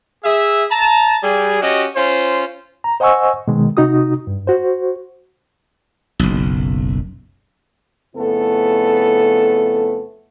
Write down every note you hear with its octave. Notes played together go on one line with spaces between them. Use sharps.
G#4 E5
A5 A#5
G3 G#4
C#4 F#4 G4 D#5
C#4 F4 C5
A#5
C5 D#5 F#5 G#5 C#6 E6
B2 D#3 G#3
C3 D#4 F#4 D#6
G2
F#4 C5
F#1 B1
F2 C#3 A3 B3 E4 A4